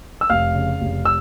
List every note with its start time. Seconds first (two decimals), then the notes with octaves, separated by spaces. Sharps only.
0.21 E6
0.30 F1 F5 F6
0.55 C#3
0.81 F1
1.05 E6